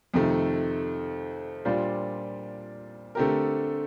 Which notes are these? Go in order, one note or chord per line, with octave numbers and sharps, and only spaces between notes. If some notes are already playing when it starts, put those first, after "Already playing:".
F2 C3 D#3 A3
A#2 G3 D4 F4 C5
D3 A3 C4 G4 A#4